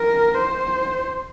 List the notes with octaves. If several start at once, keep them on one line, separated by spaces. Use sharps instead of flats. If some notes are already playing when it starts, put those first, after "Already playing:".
Already playing: A#4
C5